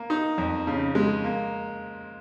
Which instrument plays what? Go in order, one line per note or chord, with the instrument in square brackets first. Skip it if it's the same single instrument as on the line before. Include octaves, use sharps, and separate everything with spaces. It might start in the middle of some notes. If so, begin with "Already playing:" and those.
Already playing: [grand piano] A#3
D#4
F2
C#3
G#3
A#3